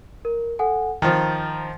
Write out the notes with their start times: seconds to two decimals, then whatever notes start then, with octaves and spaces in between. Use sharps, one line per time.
0.25 A#4
0.59 A4 F#5 G#5
1.02 D#3 F3 A#5 A6